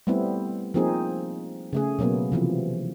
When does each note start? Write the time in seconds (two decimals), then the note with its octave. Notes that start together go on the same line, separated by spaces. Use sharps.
0.07 G3 A3 B3 C4 E4
0.74 F3 A#3 C4 D#4 G#4
1.73 C#3 A3 G#4
1.99 B2 F#3 A#3 B3
2.32 C3 E3 F3